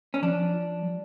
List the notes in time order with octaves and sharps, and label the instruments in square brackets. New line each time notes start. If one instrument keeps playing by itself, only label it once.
[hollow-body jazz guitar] C#4
[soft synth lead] F3 [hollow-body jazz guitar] D4
[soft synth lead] F3
G3